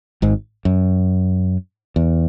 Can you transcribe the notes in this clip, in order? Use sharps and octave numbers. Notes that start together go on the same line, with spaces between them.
G#1 G#2
F#2
E2